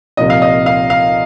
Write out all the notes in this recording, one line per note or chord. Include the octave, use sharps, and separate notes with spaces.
C2 A#2 F3 D#5
F5
D#5
F5
F5